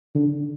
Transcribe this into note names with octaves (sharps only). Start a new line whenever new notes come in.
D3